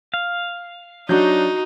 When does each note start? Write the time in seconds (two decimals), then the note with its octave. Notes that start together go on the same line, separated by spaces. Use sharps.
0.14 F5
1.09 F#3 D4 D#4 F#4 G6